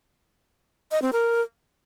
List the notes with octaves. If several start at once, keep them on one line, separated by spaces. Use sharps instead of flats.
D#5
C4
A#4